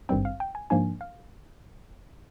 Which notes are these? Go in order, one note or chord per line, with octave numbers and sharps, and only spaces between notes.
G#1 G2 D#3 G3 C4 G5
F5
G5
G#5
G#2 F3 A#3 D4 G#5
F5